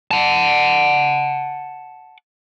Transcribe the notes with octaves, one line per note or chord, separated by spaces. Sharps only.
F#5 A5